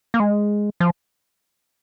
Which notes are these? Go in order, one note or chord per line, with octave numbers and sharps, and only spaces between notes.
A#3
G#3
F3